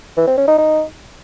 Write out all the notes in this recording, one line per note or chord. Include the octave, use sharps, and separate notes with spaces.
E3
C4
C#4
D#4
D#4